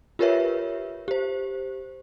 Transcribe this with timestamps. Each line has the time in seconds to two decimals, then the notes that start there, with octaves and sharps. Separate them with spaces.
0.19 F4 G4 A#4 B4 C#5 E5
1.08 G4 C5